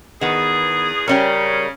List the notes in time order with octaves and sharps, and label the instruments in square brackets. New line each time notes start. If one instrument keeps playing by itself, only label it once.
[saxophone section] E2 G#4 [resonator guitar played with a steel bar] D#3 B3
[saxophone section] C#3 [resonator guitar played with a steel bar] G3 C#4 A#4